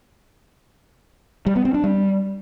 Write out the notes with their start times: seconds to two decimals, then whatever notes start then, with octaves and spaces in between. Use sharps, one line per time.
1.46 G3
1.56 B3
1.65 C4
1.74 D4
1.84 G3